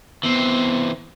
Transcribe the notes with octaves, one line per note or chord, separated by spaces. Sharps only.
E3 B3 C4